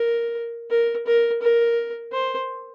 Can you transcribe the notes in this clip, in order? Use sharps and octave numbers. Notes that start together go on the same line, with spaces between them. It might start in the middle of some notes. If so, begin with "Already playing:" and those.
Already playing: A#4
A#4
A#4
A#4
C5